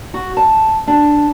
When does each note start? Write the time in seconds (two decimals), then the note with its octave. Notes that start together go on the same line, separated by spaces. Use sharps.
0.14 F#4
0.37 A5
0.88 D4